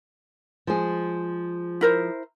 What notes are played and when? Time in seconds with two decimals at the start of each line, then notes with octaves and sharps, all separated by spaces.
0.67 F3 G#3 G#4
1.81 E4 A#4 C5